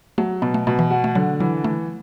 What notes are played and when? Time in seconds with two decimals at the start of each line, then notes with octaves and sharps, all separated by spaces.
0.18 F#3 A3
0.42 B2 B3
0.54 A3
0.67 B2 A3
0.79 E3
0.91 F#4
1.04 A3
1.15 D3 F#3
1.40 E3 F#3
1.64 E3 A3